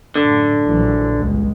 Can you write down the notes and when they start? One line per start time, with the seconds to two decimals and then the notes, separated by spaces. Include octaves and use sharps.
0.16 F#2 A2 D3
0.65 A#1 E3 F#3
1.19 G1 C#2 G#3